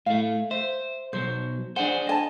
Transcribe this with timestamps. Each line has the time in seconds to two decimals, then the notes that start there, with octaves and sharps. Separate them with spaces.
0.06 A2 A3 F5
0.51 C5 E5
1.13 B1 F#3 C5
1.76 D4 G#4 C5 F#5
2.07 D#5 G#5 A5